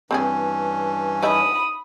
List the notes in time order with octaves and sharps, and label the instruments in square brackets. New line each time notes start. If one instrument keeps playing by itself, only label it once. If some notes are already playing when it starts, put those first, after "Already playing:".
[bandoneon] G2 E3 C#4 [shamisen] C4 E4 G#4
[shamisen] D#4 D5 E5 [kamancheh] B5 D#6